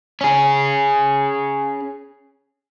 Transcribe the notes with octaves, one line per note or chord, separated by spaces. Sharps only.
C#4 G#4